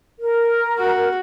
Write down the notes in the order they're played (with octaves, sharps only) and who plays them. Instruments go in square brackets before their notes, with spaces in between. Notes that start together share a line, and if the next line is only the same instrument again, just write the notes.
[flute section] A#4
[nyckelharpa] F#4